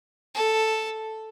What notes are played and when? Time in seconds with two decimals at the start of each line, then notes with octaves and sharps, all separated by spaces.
0.35 A4